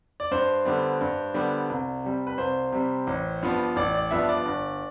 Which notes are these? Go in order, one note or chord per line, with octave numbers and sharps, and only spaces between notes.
D5
G2 C5
D3 G3 B3 D4
G2
D3 G3 B3 D4
C2
C3 G3
B4
C2 C5
C3 G3
A1
G2 F3 B3 D4
A1 D5
D5
G2 F3 B3 D4 E5
D5
G1